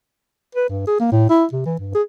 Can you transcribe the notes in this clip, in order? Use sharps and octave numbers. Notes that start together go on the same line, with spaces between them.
B4
G2
G#4
A#3
A2
E4
C3
E3
G2
G#4